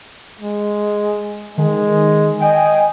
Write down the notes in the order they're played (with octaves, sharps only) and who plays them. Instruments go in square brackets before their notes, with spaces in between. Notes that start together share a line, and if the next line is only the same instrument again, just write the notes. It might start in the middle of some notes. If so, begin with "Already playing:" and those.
[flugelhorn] G#3
[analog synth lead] D#3 [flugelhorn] G#3
[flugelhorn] D#5 [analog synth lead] G5 [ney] G#5